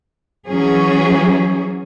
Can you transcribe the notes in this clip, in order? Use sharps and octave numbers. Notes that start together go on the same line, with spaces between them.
E3 F#3 C#4 G#4